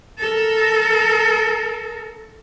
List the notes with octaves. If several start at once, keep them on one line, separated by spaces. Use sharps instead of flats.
A4 A#4